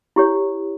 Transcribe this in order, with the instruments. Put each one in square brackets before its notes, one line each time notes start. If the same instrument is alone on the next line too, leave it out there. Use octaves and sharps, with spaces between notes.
[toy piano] E4 G4 C#5